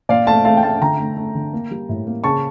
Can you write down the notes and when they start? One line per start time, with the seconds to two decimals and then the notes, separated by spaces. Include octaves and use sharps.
0.09 A#2 D5 F5
0.27 A3 F5 A5
0.45 A3 F5 A5
0.57 G5
0.63 A3 F5 A5
0.81 D3 G5 A#5
0.99 A3
1.17 A3
1.35 D3
1.53 A#3
1.71 G3
1.89 A2
2.07 A#3
2.24 C#3 A5 C#6